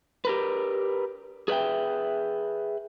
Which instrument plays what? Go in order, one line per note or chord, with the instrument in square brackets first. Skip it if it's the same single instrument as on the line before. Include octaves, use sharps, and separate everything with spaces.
[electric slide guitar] G4 A#4 B4
G#4 B4 D5 E5 G5